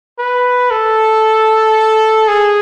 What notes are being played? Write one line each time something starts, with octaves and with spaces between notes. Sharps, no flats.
B4
A4
G#4